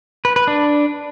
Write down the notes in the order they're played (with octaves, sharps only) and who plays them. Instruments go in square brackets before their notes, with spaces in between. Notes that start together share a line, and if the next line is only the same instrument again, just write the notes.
[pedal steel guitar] B4
B4
D4